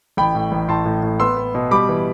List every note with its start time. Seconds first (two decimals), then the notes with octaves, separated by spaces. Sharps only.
0.17 A1 G5 B5
0.35 A2
0.52 A1
0.68 A2 A5 C6
0.85 A2
1.03 A2
1.20 B3 C6 E6
1.37 B3
1.55 B2
1.71 G3 B5 D6
1.89 E3